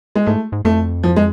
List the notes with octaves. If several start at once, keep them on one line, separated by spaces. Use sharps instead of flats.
G#3
G#2 A3
G#2
F2 A3
F3
G#3